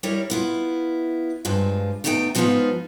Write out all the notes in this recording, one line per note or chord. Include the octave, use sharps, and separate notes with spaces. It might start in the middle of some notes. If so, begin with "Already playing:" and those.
G3 E4 A#4 C#5
B3 E4 F4
G2 F3 G#3 F4
E2 A3 B3 D#4 C#5 G5
G#2 F3 B3 C#4 D#4 F4